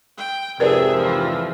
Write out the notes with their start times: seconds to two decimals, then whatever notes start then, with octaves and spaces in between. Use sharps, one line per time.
0.18 G5
0.60 F2 G#2 C3 G#4 A#4 B4 D5 E5
0.95 E3 F3